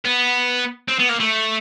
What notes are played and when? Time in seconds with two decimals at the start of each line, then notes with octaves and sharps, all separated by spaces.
0.05 B3
0.88 C4
0.99 B3
1.09 A#3
1.20 A3